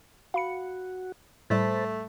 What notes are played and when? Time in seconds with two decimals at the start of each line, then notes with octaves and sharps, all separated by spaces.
0.34 F#4 F5 B5 C#7
1.50 A2 G3 A3 C5 A5 B5